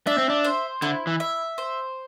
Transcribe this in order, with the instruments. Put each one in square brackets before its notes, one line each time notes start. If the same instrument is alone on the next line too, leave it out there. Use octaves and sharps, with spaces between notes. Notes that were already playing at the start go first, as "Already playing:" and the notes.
[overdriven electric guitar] D4 [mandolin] E5
[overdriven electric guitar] C4
D4
[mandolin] C5
[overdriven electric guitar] D3 [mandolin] E4
[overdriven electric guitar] E3
[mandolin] E5
C5